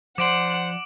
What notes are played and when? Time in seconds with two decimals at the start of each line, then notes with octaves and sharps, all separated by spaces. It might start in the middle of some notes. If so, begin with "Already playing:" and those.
0.18 F3 C5 D5 F#5 D6 D7 F#7